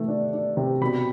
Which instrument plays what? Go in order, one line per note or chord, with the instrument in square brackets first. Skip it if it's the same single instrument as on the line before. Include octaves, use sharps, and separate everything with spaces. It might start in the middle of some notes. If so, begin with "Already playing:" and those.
Already playing: [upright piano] C3 E3 A3
D4
D4
C3
B2 B5